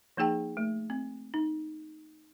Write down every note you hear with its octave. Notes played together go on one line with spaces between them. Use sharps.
F3 A#3 D#4 G#4 G5 A5
A3
C4
D#4